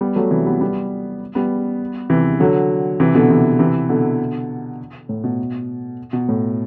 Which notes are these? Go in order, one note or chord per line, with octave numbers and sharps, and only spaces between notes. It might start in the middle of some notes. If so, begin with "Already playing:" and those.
G3 B3
F#3 A3
C3 E3
G3 B3
G3 B3
G3 B3
C3 E3
D3 F#3
C3 E3
B2 D3
C3 E3
C3 E3
B2 D3
A2
B2
B2
A2